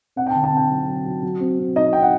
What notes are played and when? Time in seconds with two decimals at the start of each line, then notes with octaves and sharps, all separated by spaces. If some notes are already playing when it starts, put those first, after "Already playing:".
0.16 C4 F#5
0.27 G5
0.30 A5
0.35 D3
0.44 A5
0.52 C4 G5
0.70 F#3
0.88 F#3
1.05 F#3
1.23 F#3
1.40 C4
1.59 C4
1.76 D#4 D#5
1.93 G5
2.02 F#5